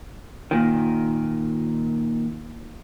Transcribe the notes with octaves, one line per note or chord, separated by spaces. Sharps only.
A#2 D#3